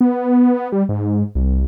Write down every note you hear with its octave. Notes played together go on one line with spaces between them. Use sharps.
B3
G3
G#2
C2